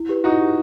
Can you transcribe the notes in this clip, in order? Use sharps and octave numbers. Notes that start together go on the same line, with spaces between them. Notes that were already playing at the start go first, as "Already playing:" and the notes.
Already playing: E4
G4 B4
D#4 E4 F#4
G4 B4